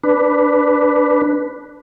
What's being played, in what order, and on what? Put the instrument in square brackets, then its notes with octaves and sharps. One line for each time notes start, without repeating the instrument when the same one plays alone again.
[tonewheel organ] D4 B4